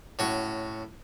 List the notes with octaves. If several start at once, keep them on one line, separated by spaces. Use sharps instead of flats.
A2 C#4 F#4 C#6